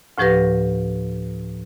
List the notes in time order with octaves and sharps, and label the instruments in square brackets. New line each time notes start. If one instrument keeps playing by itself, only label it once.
[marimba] D2 A2 F3 G4 B4 A#6